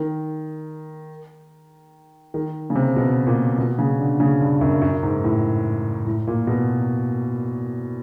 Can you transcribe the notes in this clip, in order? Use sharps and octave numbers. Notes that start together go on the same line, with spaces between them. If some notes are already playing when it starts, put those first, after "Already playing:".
Already playing: D#3
D#3
C#3
C3
B2
A#2
B2
C#3
D3
C#3
G2
F#2
F#2
G#2
A2
A2
A#2
B2